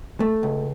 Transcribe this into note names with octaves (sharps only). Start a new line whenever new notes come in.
A3
C#2